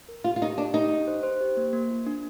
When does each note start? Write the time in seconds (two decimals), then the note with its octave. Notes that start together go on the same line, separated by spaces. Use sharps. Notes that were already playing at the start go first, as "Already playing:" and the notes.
0.09 A#4
0.24 F4 G4
0.36 F4
0.41 D#4 G4
0.57 D4 G4
0.74 D#4 G4
0.91 G4
1.07 C5
1.23 C5
1.41 G4
1.57 A#3
1.73 A#3
1.91 F4
2.06 D4